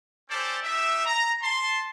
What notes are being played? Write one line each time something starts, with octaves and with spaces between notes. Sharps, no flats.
C#4 G4 A4 C5 D5
D#4 G4 E5
A#5
A5 C6